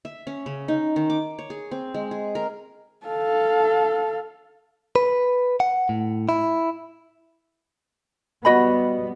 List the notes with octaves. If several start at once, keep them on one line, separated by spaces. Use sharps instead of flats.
E5
C#4
C#3
D#4
D#3
D6
C#5
G#4
C4
G#3
G#4
A#4
A4 F5
B4
F#5
A2
E4
G3 B3 F#4 D#5 B5